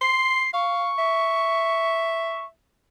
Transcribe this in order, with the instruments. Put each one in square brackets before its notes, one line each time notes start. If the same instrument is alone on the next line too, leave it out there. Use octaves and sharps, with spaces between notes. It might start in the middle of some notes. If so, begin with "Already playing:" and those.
[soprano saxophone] C6 [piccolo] C7
[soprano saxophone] F5 [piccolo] C#6
[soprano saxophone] E5